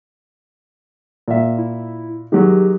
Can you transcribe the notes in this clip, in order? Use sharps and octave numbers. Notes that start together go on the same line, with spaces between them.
A#2 E5
E4
D#3 F#3 G#3 G4